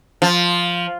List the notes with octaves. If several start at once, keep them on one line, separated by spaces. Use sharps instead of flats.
F3